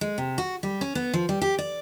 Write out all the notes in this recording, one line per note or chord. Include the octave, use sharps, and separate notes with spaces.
G#3
C3
F#4
G3
C#4
B3
F3
G3
G4
D5